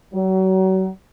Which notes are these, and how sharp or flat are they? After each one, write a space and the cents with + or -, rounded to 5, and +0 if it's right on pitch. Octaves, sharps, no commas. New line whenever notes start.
F#3 +35